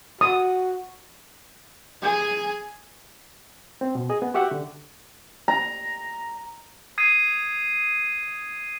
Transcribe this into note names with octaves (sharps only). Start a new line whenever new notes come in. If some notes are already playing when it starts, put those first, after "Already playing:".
F#4 D#6
G#4 G#5
C4
B2
G#4 D#5
B3
F#4 G4 E5 F#5 C#6
D3
A#5
D#6 G#6 C7 D#7